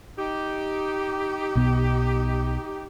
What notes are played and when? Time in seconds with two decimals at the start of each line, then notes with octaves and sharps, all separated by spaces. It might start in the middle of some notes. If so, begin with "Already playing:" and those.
0.18 D#4 G4
1.55 B1 B2 B3